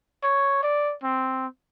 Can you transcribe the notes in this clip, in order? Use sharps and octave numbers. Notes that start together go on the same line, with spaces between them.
C#5
D5
C4